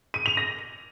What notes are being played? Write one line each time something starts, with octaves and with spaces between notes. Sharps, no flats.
D#7
F7
A#6